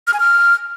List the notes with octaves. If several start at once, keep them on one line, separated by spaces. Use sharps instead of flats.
F6
G#5
F6